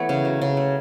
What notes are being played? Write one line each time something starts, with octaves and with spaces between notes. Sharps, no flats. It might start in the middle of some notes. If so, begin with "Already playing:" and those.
Already playing: E3 A3 B3 B4 C#5
C#3
F#3
C#3
A3